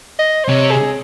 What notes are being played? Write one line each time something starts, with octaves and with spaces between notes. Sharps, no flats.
D#5
C5
C3 C#5
G#4